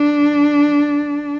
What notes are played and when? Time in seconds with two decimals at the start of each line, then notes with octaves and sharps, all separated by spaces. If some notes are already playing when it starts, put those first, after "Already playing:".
Already playing: D4